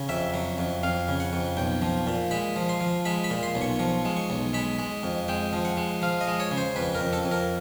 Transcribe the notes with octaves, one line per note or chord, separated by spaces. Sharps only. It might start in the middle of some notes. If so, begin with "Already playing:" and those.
Already playing: C#3
F2 E5
F#3
F2
F2 F5
C#3
F#5
F2
B1 G5
F3
A#2
G#3 B5
F3
C6
F3
G#3 B5
B5
A#2
C6
B1
C#6
F3 C#6
G#3
C#6
B1
G#3 B5
G#3
F2
G#3 G5
F3
F#5
G#3
F3 F5
D#5
G#3
C#5
C#3
C5
F2 B4
A#4
F2
A4
F2
A#4